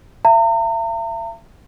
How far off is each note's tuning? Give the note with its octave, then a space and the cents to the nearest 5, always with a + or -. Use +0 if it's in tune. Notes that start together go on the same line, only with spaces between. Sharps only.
E5 +40 A#5 -40